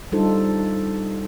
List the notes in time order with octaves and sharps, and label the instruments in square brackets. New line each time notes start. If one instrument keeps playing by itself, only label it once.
[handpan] G3 D4 D#4 F4 A4 C5